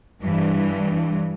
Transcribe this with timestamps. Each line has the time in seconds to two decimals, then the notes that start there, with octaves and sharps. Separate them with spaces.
0.22 G2 E3